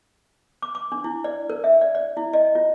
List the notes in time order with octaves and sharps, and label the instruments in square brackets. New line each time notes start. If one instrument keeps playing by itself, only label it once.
[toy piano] D6
D6
D4
E4
D5
A#4
E5
D5
D5
E4
D#5
F4